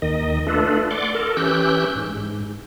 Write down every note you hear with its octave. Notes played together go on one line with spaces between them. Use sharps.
D#2 D#3 D#5
A3 D4 F4 A4 B4
D5 F#5 C6 D6
A4 A#4
E3 C#4 G4 E6 F#6 G6
G#2